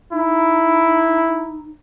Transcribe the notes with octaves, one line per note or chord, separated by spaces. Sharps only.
D#4 E4